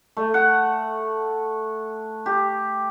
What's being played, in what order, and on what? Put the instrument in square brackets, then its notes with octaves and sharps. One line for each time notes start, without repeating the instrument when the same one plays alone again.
[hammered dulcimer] A3
F#5
G4